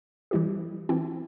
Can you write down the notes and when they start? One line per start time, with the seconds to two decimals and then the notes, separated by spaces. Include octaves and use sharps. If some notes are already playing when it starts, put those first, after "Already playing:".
0.31 E3 G3 E4 G4
0.89 E3 C4 E4